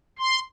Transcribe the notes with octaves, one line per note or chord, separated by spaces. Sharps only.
C6